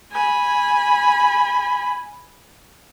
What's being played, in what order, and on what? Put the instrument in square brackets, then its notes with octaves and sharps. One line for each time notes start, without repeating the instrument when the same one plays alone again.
[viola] G#5 B5